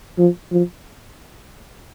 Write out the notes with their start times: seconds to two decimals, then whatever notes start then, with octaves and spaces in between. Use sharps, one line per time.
0.18 F3
0.52 F3